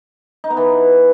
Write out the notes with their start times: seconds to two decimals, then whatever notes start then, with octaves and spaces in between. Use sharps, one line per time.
0.44 D#4
0.50 B3
0.57 E3